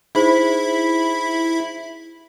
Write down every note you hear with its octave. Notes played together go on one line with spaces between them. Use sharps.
D#4 E4 G#4 C5 B5